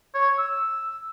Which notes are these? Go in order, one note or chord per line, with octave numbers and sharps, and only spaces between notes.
C#5
E6